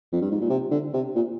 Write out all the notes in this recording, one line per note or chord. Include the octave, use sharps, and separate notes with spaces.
F2
G2
G#2
A#2
C3
D3
C3
A#2